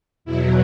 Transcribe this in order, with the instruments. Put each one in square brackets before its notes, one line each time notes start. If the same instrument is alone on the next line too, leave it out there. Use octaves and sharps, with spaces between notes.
[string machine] E2 B2 F#3 E4